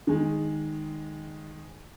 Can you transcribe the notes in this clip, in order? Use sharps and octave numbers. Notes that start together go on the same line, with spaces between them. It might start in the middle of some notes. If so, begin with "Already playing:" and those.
D#3 G#3